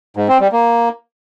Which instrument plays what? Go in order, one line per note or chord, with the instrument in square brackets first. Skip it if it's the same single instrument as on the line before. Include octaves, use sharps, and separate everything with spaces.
[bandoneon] G#2
C4
G3
A#3